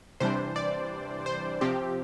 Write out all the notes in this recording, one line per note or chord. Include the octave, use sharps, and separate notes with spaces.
C3 E3 G3 D4 C5
D5
C5
C3 F3 C4 G4